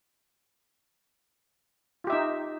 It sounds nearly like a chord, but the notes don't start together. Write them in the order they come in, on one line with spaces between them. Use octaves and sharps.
F4 G4 E5 D#4